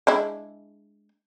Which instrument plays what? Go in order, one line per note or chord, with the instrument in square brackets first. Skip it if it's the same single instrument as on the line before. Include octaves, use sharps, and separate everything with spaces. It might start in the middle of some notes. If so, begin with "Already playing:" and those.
[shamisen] G#3 D4 E4